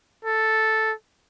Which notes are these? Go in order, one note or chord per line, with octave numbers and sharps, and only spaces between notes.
A4